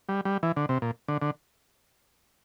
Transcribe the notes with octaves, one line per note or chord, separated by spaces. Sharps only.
G3
G3
E3
D3
C3
A#2
D3
D3